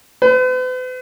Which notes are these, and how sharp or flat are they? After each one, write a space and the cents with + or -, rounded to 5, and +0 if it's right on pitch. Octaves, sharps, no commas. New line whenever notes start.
B4 +45